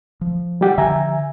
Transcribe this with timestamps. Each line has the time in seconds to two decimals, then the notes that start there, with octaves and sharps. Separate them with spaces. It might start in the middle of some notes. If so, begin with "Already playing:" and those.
0.21 F3
0.61 G3 G4 F#5
0.78 D3 F3 E5 G#5 A#5